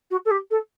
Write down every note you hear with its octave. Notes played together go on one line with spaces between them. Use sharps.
F#4
A4
G4
A4